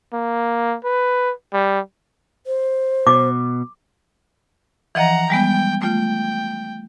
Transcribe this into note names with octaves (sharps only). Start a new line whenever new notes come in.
A#3
B4
G3
C5
B2 D6
E3 F3 D#5 F#5 A#5
G3 G#3 B3 G5
A3 F4 G5